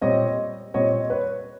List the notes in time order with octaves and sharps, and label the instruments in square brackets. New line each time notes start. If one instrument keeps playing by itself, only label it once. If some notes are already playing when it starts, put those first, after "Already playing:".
[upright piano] A#2 G3 C4 C#5 D#5
A#2 G3 C4 C#5 D#5
B4 C#5